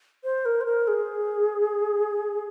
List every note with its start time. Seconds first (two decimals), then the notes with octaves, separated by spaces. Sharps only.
0.24 C5
0.45 A#4
0.61 C5
0.66 A#4
0.88 G#4